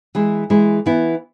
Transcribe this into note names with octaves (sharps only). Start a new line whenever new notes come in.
E3 G#3 E4
E3 G#3 E4
E3 B3 E4